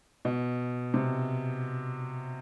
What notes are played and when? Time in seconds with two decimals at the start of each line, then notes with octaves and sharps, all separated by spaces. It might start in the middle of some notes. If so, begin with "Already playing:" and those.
0.25 B2
0.94 C3